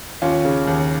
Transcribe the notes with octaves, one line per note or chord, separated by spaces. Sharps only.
D#2 C#4 F4
C#3
D#2